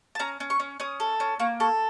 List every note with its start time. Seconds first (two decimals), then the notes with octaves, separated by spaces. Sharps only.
0.15 A5
0.20 C#4 A#5
0.40 C#4
0.50 C#6
0.60 C#4
0.80 C#4 D#6
1.00 A4
1.20 C#4
1.39 A#3 C#6
1.60 A4 C#6